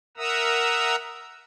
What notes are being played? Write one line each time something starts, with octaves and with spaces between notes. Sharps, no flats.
A#4 E5 F#5 A#5 D#6 E6